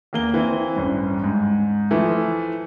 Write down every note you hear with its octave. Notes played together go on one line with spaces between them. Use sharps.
E2 A#3 G7
E3 C4
A1 G2
G#2
E3 F3 A3